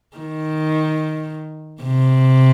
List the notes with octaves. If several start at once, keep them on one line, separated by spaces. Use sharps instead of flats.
D#3
C3